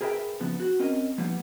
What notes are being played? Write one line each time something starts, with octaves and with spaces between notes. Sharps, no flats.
G#4 A#4 B4 D5 E5 G5
C#3 F3 B3
F#4
C4 C#4 A#4 D#5
F3 G3 A#3 B3 D#4